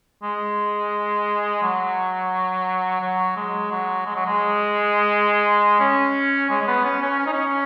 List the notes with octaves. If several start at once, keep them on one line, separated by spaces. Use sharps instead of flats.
G#3
F#3
F#3
G#3
F#3
G#3
F#3
G#3
C#4
G#3
G#3
B3
C#4
C#4
C#4
D#4
C#4